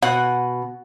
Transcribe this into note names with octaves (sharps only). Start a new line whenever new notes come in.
B2 F#5